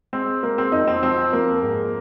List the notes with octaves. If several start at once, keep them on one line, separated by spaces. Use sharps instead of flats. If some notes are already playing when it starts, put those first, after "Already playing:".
G#3 C4
G#3 A#3
C4
F2 D#4
C4
F3 C4
F2 A#3
G#2